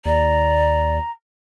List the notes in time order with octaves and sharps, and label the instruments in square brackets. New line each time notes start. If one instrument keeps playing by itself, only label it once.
[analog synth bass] D#2 [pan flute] D5 [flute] A#5